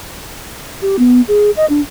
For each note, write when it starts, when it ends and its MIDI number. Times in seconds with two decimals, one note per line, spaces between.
0.82 0.96 67
0.99 1.21 59
1.28 1.51 68
1.57 1.65 75
1.70 1.81 62